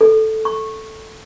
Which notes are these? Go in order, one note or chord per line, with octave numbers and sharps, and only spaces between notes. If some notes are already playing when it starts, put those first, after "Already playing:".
A4
C#6